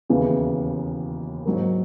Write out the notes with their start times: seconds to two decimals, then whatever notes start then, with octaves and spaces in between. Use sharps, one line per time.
0.09 E1 D#2 C#3 E3 B3
1.45 G#2 F#3 A#3